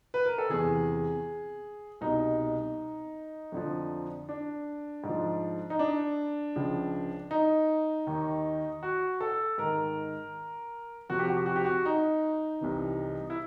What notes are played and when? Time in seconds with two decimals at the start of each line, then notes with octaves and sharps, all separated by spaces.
0.14 B4
0.26 A#4
0.38 A4
0.49 E2 C3 E3 G#4
2.01 C2 B2 D#4
3.52 F2 D3 F3
4.29 D4
5.04 G#2
5.09 F3
5.70 D#4
5.79 D4
6.56 C#2 C#3 F3
7.31 D#4
8.07 D#2 D#3
8.83 F#4
9.21 A4
9.58 G#2 D#3 A#4
11.09 F2 C3 F3 F#4
11.19 G4
11.29 F#4
11.37 G4
11.46 F#4
11.56 G4
11.65 F#4
11.86 D#4
12.61 C2 C3 E3
13.30 E4